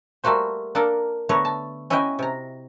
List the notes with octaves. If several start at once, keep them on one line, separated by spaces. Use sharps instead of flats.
G3 A3 A#3 F#4 C5
A#3 D4 A4 A#4
D3 A3 B3 C#5 A#5
A5
C#4 E4 F#4 D#5 E5 G5
C3 A#5